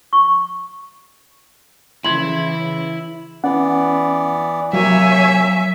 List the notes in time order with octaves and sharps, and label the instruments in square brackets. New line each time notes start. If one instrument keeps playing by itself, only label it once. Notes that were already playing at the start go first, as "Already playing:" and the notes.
[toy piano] C#6
[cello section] C#3 E3 [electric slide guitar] E4 [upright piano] C6 G#6 [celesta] F#7
[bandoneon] E3 B3 D5 [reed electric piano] C#4 F#5
[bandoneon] C3 A#3 [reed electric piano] F#3 [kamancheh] C#5 G#5 [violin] E5